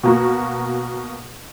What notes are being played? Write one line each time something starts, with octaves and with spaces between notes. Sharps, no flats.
B2 A#3 F#4